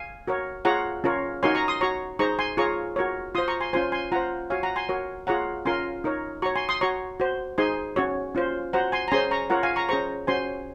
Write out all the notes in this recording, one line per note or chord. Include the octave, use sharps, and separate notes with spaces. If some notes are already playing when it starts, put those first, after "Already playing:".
Already playing: F5 G#5
F#4 A#4 C#5
F4 G#4 C#5 F#5 A#5
C#4 F4 A#4 C#5
D#4 F#4 A#4 C#5 G#5 C6
A#5 C#6
C6 D#6
F#4 C#5 A#5 C#6
D#4 G#4 C5 A#5 C#6
G#5 C6
F4 G#4 C#5 A#5 C#6
F#4 A#4 C#5
F4 C5 C6 D#6
A#5 C#6
G#5 C6
C#4 F4 C5 G#5 C6
G#5 C6
F4 C5 F#5 A#5
F#4 C#5 F5 G#5
F#5 A#5
G#5 C6
F#4 A#4 C#5
F4 G#4 C#5 F#5 A#5
C#4 F4 A#4 G#5 C6
D#4 A#4 C#5
F#4 C#5 A#5 C#6
G#5 C6
C6 D#6
F#4 C#5 A#5 C#6
F#4 C5
D#4 G#4 C5 G#5 C6
C#4 F#4 C#5
C#4 F4 C5
F#4 C5 F#5 A#5
G#5 C6
A#5
C#4 G#4 C5 G#5 C6
A#5 C#6
F4 A#4 C#5 F#5 A#5
F5 G#5
A#5 C#6
C#4 G#4 C5 A#5 C#6
C#4 F#4 C5 G#5 C6